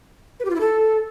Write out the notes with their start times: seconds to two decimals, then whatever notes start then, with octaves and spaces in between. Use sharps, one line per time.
0.40 B4
0.45 G4
0.50 F4
0.55 E4
0.61 A4